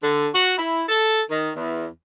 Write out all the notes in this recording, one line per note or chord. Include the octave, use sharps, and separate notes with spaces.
D3
F#4
E4
A4
D#3
E2